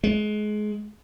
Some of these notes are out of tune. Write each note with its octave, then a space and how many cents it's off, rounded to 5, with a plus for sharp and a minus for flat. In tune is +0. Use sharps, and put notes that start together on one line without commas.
G#3 +25